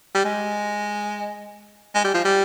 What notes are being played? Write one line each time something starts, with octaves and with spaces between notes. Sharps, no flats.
G3
G#3
G#3
G3
F3
G3